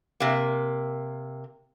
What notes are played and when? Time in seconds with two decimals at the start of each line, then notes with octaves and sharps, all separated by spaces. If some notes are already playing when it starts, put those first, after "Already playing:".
0.20 C3 A#3